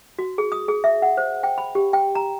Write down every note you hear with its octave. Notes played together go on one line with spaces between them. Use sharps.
F#4
G#4
D#6
G#4
E5
F#5
C5
G5
B5
G4
G5
A#5